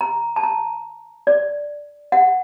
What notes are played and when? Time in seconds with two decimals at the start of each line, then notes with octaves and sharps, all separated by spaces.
0.01 A#5
0.36 A5
0.43 A#5
1.27 D5
2.12 F#5